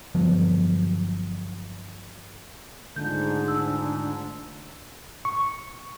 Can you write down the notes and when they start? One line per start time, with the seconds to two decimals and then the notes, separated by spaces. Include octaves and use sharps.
0.15 G1 F3 F#3 B3
2.96 G#2 D3 A3 D4 F4 G6
3.48 E6
5.25 C#6